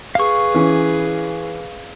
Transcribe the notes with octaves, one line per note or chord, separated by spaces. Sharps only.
G#4 B4 F5 C#6
E3 C#4